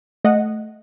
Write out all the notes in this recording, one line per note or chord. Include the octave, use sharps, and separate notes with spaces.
A3 D#5 F#5